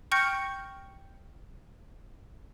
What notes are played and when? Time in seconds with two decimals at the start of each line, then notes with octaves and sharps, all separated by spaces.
0.11 G5 C#6 F6 G6 A#6 C#7